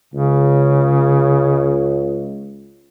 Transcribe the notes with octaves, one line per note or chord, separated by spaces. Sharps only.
C#2 C#3